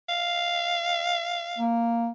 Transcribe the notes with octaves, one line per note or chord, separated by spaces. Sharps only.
F5
A#3